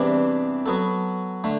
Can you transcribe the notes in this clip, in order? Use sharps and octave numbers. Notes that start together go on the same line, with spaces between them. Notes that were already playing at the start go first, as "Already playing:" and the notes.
Already playing: E2 C3 E3 G3 D4
F#3 B3 F#4 A4
D3 A3